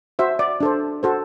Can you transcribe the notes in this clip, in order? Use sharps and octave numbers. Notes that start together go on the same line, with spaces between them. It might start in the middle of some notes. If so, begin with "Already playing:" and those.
F#4 C5 E5
D5
D4 A4 C5
F#4 A4 C5